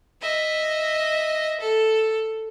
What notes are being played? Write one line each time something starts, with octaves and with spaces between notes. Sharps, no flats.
D#5 E5
A4